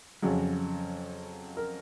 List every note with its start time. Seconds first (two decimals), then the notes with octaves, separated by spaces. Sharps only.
0.22 F2 C#3 F#3 G#4
1.57 A#4